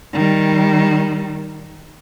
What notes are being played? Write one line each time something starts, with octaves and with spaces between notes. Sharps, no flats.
D#3 G3